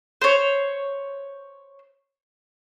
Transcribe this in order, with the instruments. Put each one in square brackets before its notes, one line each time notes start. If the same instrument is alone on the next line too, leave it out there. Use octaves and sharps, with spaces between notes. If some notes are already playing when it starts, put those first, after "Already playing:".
[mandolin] C5 C#5